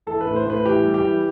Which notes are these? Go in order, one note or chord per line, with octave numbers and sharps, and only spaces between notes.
E3 A4
B4
A2
C5
A2 B4
E3 G4
G3
G4
E3